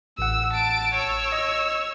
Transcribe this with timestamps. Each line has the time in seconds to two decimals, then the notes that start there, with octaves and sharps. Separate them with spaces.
0.19 A1 F#5 E6
0.53 A5 D7
0.94 C#5 E6
1.32 D#5